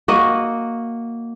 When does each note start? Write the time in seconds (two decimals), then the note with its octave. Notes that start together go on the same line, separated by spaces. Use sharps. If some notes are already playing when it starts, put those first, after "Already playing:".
0.08 A#3 F#4 D#5